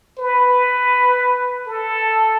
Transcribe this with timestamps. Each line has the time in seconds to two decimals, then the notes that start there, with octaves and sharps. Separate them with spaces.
0.19 B4
1.67 A4